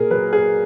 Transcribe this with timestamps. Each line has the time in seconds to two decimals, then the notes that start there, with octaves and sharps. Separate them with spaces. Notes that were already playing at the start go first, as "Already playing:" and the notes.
Already playing: A#2 G#4 A#4
0.11 F#3 B4
0.33 G#4